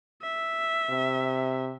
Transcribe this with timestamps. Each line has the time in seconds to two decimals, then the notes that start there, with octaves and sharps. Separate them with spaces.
0.23 E5
0.89 C3